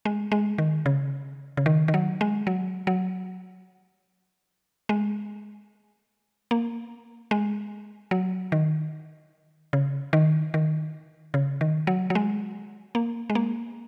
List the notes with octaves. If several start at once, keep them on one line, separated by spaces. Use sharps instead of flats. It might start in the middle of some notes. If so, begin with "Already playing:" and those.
G#3
G#3
D#3
C#3
C#3
D#3
D#3
F#3
G#3
F#3
F#3
G#3
A#3
G#3
F#3
D#3
C#3
D#3
D#3
C#3
D#3
F#3
F#3
G#3
A#3
G#3
A#3